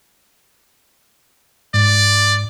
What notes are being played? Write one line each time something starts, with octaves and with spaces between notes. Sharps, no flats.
G#2 D5